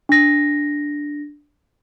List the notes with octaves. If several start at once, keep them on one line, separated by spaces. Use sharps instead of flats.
D4 A#6